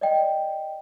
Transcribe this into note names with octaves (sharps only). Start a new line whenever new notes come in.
D5 D#5 G5